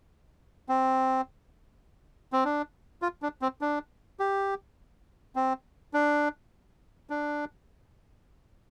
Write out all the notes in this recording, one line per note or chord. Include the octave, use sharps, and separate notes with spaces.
C4
C4
D4
F4
D4
C4
D4
G4
C4
D4
D4